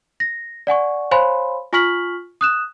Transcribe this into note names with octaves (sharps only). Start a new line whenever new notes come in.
A#6
D5 F#5 G#5 C#6
C5 C#5 F5 G#5 B5 C6
F4 G#5 C#6 F6 B6 F#7
D#6 F#6 E7